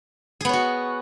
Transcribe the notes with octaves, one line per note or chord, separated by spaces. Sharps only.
B3 F#4 G#4 C#5